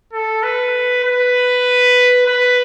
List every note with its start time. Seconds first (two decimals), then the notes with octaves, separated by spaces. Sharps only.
0.13 A4
0.43 B4
1.04 B4
2.27 B4